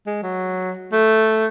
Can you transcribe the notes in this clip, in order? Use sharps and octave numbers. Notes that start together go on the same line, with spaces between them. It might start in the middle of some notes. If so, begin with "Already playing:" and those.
G#3
F#3
A3